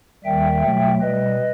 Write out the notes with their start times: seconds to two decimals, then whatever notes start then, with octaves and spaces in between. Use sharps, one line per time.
0.24 D#2 D#3 G3 E5 G5
0.63 B2 F#3 A3
1.01 B2 G3 B4 D#5